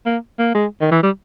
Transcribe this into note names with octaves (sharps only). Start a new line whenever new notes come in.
A#3
A#3
G#3
D#3
E3
G3